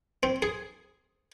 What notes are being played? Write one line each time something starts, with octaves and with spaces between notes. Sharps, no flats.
C4
G#4